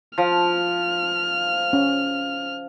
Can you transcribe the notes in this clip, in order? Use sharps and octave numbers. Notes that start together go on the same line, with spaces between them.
F3 F6
C#4